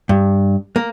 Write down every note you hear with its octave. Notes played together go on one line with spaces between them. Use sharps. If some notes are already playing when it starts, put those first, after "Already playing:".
G2
A#3